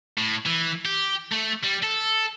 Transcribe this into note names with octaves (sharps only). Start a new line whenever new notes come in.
A2
E3
G4
A3
G3
A4